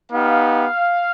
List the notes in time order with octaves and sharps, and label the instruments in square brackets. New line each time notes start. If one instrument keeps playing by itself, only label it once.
[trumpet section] B3 D#4 G4 F5